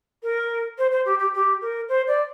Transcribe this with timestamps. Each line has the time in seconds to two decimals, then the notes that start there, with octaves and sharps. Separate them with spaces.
0.23 A#4
0.78 C5
0.91 C5
1.05 G4
1.19 G4
1.34 G4
1.61 A#4
1.88 C5
2.07 D5